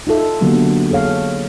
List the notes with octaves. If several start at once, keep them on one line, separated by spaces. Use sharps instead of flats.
D#4 F4 A4 E5
D3 F#3 A#3 B3 D4 G4
G#4 A4 C#5 F5